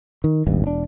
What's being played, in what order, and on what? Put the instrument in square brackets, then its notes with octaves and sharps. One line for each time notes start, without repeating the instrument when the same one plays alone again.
[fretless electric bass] D#3
D#1 G#1 G2
E1 D4